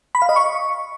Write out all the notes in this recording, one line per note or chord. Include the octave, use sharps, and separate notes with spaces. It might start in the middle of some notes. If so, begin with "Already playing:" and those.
B5
F5
D#5
C#6